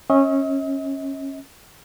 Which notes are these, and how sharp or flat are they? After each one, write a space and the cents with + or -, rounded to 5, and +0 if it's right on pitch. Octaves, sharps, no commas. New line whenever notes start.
C#4 -20 D#5 +45